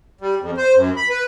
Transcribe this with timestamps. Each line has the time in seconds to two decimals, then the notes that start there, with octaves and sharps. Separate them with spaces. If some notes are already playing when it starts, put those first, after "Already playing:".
0.21 G3
0.41 F2
0.57 C5
0.75 F#2
0.97 B5
1.09 B4